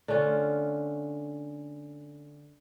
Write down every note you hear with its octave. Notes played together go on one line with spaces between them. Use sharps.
D3 A3 C#4 F4